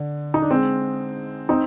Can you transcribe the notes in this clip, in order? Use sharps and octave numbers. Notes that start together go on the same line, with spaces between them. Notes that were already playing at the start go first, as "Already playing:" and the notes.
Already playing: D3
D#4
D4
G#3 C4
C4 D#4